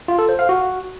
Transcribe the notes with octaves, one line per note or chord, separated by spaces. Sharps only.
F4
A4
C5
F5
F#4